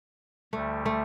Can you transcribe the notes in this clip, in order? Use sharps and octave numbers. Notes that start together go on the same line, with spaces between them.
D2 D3 G3 A3
A3